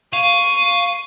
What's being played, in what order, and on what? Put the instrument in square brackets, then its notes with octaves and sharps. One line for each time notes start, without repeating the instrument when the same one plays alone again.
[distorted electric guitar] F5 [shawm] C#6 [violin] D#7